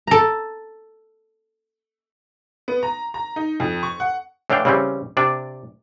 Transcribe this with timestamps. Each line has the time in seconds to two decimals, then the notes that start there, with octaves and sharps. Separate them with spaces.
0.07 A4 A#5
2.68 B3
2.83 A#5
3.14 A#5
3.36 D#4
3.60 F2
3.83 C#6
4.00 F#5
4.50 A2 E3 D4 F5 G5
4.65 C#3 E3 G3 C4 C#4
5.17 C3 D4 D5